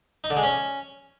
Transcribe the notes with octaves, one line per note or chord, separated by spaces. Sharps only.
D#4
D3
G#3
C#4